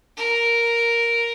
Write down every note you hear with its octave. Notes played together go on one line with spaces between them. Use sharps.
A#4